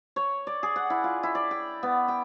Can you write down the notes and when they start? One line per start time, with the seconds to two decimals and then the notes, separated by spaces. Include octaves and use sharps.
0.16 C#5
0.47 D5
0.63 G#4
0.76 F#5
0.90 E4
1.04 F4
1.23 E4
1.35 D5
1.51 G5
1.83 B3
2.08 G5